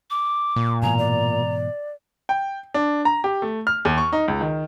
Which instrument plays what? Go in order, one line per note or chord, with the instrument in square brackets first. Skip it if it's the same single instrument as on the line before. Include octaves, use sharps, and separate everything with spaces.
[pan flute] D6
[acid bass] A#2
[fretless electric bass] G#2 B2 E3 [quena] G#5 [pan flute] A#5
[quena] D5
[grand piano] G5
D4
A#5
G4
A3
F6
D#2
C#6
D#4
C#2
D#3